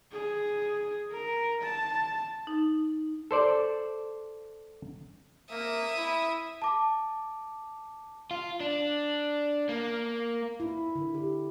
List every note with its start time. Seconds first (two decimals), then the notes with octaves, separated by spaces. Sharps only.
0.11 G#4
1.11 A#4
1.62 A5
2.47 D#4
3.31 A4 C5 D5
5.51 A#3 E5 D#6
5.97 E4
6.62 A5 D6
8.31 F4
8.60 D4
9.69 A#3
10.60 E4
10.95 D3
11.14 G4